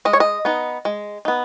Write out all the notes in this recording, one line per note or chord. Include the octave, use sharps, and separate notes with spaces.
G#3 D#5
C#5
D#5
B3 D#4
G#3
B3 D#4